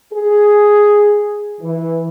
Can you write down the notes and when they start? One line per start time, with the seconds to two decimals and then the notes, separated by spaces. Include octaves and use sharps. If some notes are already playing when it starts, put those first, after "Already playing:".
0.13 G#4
1.61 E3